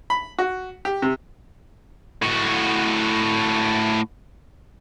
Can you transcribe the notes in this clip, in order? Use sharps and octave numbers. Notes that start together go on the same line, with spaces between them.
B5
F#4
G4
C3
A2 F#4